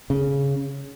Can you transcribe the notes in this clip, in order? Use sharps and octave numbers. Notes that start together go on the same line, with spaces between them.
C#3